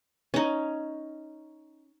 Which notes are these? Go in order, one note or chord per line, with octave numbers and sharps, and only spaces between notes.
C#4 D#4